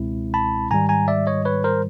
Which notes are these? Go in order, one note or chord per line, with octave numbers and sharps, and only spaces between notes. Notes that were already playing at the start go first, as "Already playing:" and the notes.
Already playing: C#2 B2 G#3 C4 E4
A5 B5
G#2 D#3 G3 G#5 A#5
G#5 A#5
D5 E5
C#5 D#5
B4 C#5
A#4 C5